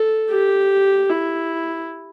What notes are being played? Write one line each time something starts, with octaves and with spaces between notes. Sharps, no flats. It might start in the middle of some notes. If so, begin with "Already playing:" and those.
Already playing: A4
G4
E4